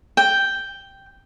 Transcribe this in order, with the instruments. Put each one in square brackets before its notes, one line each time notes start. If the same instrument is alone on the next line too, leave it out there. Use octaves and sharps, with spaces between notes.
[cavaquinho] G5